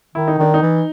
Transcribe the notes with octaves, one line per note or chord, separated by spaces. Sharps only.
D#3 E4
D#4
D#3 D4
D#4
E3